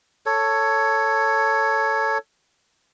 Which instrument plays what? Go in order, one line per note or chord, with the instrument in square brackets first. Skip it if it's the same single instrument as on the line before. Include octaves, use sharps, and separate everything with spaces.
[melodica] A4 C#5